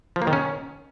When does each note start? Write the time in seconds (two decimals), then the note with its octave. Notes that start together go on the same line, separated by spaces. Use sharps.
0.16 F3
0.22 A#3
0.27 D#3
0.33 C#4